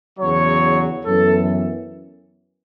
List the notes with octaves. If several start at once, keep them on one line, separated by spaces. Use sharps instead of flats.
E2 C#3 F#3 C#5
F#2 E3 B3 A4